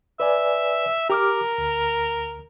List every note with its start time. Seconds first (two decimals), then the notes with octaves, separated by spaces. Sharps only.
0.20 B4 D5 E5 G#5
1.10 G4 A#4 D6 F6
1.58 D2